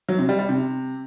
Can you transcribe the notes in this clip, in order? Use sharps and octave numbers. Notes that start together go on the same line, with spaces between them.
F#3
C3
G3
G3
C3